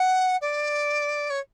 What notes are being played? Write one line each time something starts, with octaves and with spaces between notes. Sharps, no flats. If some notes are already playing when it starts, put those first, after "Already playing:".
Already playing: F#5
D5
C#5